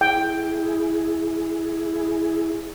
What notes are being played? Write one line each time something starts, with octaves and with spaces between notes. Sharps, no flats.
E4 G#4 G5